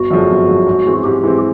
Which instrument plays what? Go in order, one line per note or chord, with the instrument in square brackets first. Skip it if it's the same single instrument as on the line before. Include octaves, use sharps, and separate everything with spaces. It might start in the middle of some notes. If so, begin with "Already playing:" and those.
Already playing: [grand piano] G1 [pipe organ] F#4
[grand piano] F#2 D3 F3 G#3
G1
F#2 D3 F3 G#3
G#2
E3 G#3 C4
[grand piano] G#2 [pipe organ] G4
[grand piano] E3 G#3 C4